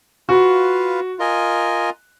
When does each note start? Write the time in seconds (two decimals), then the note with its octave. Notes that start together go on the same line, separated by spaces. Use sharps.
0.29 F4 F#4 B4 F5
1.19 F4 A#4 D#5 G#5